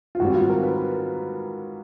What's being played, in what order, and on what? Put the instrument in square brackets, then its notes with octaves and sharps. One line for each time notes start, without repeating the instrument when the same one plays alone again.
[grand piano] F4
[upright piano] G#2 D#3 G3 C4 [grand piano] F#4
[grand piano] F4
A#4
B4